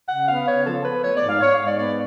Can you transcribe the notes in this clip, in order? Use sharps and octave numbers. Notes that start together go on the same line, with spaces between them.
C#3 F#5
B3 F5
C#3 C#5
F3 A4
B3 B4
A3 C#5
D5
G#2
F5
B3 C#5
F5
G#2
D5
B3 D5